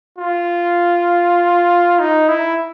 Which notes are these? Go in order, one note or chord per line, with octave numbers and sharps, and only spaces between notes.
F4
D#4
E4